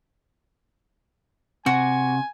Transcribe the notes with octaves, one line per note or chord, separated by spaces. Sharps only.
C3 F#4 G#5